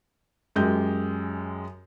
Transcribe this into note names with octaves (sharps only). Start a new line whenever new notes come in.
F#2 G#3 G4 G6